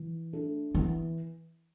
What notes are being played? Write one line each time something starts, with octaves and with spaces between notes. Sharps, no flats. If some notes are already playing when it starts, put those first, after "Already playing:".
Already playing: E3
A3 D4 A4
E3 B3